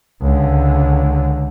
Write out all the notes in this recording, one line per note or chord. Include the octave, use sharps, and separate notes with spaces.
C#2 D3